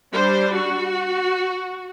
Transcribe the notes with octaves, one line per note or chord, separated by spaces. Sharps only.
G3 D4 C5
F#4